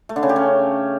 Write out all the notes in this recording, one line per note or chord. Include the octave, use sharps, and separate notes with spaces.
A3
D3
C#3
G4
C#4